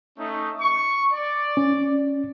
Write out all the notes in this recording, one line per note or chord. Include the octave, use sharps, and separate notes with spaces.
A3 C#4 D#4
C#6
D5
C#4